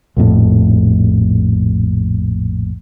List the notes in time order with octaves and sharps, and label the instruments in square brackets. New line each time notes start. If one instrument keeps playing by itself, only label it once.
[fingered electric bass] A#1 F2 A2